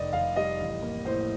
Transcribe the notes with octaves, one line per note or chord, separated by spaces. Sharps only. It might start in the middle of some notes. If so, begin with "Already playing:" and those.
Already playing: F1 F2 D#3 D5 D#5
F1 F5
G3 D#5
A1
A#3
A2 C5